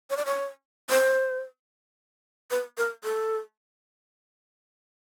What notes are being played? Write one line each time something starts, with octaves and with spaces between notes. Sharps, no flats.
C#5
D5
C#5
C5
B4
A#4
A4